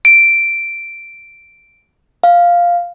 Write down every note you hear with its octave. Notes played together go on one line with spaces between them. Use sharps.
D7
F5